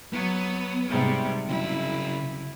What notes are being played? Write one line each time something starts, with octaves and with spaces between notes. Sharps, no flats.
F#3 B3
G#2 C3 G3
C#3 F#3 E4